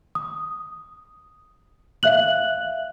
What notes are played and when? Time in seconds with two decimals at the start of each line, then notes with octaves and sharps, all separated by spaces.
0.15 D#6
2.03 E5 F5 F#6 F#7